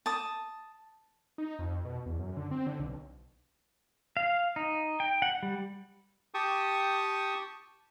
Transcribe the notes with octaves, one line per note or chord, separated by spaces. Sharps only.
A5 D#6
D#4
F2
B2
E2
F#2
D3
C4
D3
B1
F5
D#4
G5
F#5
G3
G4 G5 A5 C#6 D#6